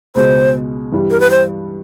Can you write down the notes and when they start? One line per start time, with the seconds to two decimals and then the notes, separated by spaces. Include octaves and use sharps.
0.15 C#2 B2 G#3 C5
0.92 G2 E3 G3
1.10 A#4
1.20 B4
1.31 C5